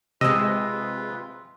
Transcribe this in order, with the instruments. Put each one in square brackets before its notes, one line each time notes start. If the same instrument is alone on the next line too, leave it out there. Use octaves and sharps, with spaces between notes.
[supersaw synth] C3 G#3 [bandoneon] F4 B4 [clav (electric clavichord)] D#5 [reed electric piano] E6